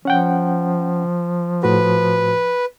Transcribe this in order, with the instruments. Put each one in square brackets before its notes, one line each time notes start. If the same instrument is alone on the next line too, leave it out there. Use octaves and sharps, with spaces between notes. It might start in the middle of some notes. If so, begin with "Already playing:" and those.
[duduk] F3 [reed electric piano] C#4 F#5 G5
[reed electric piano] A2 F#4 [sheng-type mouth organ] B4